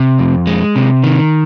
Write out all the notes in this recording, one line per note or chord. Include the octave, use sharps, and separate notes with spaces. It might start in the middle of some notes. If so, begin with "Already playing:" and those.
Already playing: C3
F2
G#3
C3
D#3